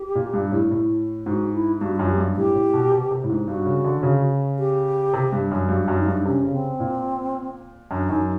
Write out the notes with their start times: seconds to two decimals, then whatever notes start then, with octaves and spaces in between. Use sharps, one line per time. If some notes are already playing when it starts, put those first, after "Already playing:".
Already playing: G4
0.15 A#2
0.34 G2
0.52 A2
0.71 A2
1.26 G#2 F#4
1.53 E4
1.81 G2 F#4
1.96 F#2 F4
2.09 G4
2.18 G2
2.37 A2 G4
2.55 A2
2.74 B2
2.92 C3
3.11 C3
3.24 A2
3.29 G#2
3.48 G2 F#4
3.66 C#3
3.84 D3
4.03 C#3
4.58 G4
5.14 C3
5.32 G2
5.51 F#2
5.69 G2 F#4
5.83 F#2 F#4
5.97 D#4
6.06 G2
6.11 D4
6.25 C3 C#4
6.43 C#3
6.52 C4
6.80 A#2
7.91 F#2 D4
8.09 F#2 D#4